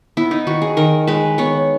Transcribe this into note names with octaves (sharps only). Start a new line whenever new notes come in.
B3 E4
D#4
D#3 F#4
G#4
D#3 A#4
G#3 B4
B3 C#5